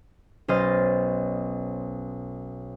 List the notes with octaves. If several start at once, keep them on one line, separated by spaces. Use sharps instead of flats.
B1 C#4 C5 D#5 F6 A6